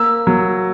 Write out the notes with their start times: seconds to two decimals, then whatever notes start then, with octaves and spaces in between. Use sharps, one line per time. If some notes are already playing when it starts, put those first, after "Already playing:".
Already playing: A#3 E6
0.27 F#3